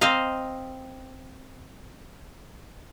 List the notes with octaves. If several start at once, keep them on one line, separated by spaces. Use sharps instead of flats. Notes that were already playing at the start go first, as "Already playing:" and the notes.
C4 C5 D#5 F5 A#5